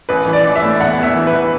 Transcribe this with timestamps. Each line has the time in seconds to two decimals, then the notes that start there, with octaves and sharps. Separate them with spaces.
0.09 A1 B4
0.26 E3
0.33 D5
0.44 A1
0.56 E5
0.62 A2
0.80 E2 F#5
0.98 E2 E5
1.15 E3
1.27 B4
1.33 E3